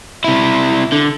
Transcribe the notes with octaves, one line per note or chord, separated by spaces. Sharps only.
C3 E4
D3